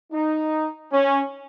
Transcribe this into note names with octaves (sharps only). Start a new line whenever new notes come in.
D#4
C#4